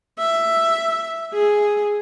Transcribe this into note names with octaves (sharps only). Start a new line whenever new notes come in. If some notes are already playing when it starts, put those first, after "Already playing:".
E5
G#4